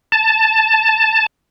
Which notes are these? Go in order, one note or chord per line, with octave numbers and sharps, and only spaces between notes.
A5